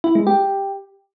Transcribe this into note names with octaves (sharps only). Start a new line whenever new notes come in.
E4
G#3
G4